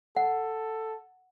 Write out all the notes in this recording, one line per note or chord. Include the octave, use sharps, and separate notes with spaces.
A4 F#5